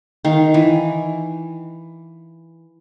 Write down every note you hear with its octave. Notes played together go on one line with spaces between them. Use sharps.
D#3 F5
E3